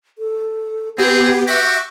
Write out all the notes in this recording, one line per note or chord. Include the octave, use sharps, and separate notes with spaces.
A4
B3 C4 G4 G#4 B4
F#4 G4 E5 C#6 D6